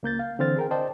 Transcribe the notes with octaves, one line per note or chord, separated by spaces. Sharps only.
C#2 A#3 G6 A6
F5
D3 E3 C4 C5 F6 A6
G#4 A#4 G5
C5 D5 D#5 G5 A5